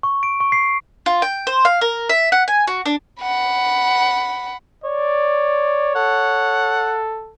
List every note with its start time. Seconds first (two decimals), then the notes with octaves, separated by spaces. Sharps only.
0.03 C#6
0.23 D7
0.40 C#6
0.52 C7
1.06 F4
1.22 G5
1.47 C5
1.65 F5
1.81 A#4
2.09 E5
2.32 F#5
2.48 G#5
2.67 F#4
2.86 D4
3.22 F#5 B5
4.84 C#5 D5
5.96 A4 F#5